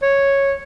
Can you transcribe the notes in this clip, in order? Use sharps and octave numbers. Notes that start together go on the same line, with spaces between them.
C#5